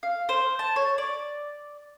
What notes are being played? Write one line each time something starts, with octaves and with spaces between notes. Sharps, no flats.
F5
C5
A5
C#5
D5